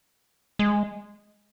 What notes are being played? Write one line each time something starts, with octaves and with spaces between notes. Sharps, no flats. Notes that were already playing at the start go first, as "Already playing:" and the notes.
G#3